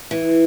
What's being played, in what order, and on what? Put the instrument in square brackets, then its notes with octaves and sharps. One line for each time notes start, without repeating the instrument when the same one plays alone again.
[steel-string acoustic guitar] E3